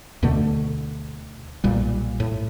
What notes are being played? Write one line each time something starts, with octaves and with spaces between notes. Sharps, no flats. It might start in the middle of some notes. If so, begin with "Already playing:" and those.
D2 B2 D3 A3
B1 A#2 G3
A2